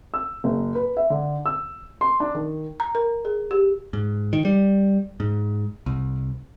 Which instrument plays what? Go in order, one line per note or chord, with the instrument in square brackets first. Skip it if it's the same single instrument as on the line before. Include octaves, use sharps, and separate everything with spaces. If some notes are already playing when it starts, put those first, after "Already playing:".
[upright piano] E6
F#1
B4
E5
D3
E6
C6
D4
D#3
[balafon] A#5
A#4
G#4
G4
[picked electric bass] G#2
D#3
G3
G#2
C2